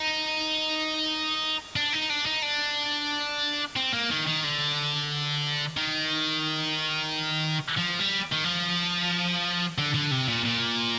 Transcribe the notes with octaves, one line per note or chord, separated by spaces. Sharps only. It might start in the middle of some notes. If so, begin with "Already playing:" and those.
Already playing: D#4
D4
D#4
D4
D#4
D4
C4
A#3
D#3
D#3
D3
D#3
F3
G3
D#3
F3
D3
D3
C3
A#2
A#2